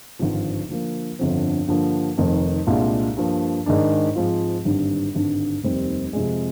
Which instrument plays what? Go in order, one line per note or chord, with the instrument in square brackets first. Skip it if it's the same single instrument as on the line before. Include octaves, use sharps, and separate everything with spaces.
[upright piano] G#1 G2 D3 F3
D3 F3 A#3
G1 F2 D3 F3 C4
G2 D3 F3 A#3
F1 F2 D#3
C2 A#2 G#3 D4 F4
G2 F3 A#3
G#2 D#3 G#3 D4
G#2 F3 G#3 C4 F4
G#1 G2 D3 G3
G#1 G2 D3
F1 D#2 D#3 G3 C4
F2 C3 F3 G#3